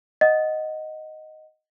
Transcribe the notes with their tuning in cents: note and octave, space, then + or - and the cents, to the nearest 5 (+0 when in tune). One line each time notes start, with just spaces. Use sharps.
D#5 +0 F#5 +0